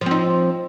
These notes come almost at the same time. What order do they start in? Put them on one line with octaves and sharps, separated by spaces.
F3 C4 D#4